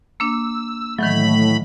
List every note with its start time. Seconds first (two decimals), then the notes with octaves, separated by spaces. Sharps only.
0.20 A#3 D4 E6
0.99 A2 D#3 E3 F#3 A3 B5